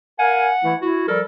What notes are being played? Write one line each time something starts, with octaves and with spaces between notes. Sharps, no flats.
A#4 F5 F#5 G#5
E3 A3 E4
E4 F#4
F3 G3 A4 A#4